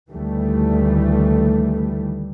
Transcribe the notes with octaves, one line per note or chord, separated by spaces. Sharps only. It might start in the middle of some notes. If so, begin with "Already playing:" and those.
D2 D#3 E3 G3 A3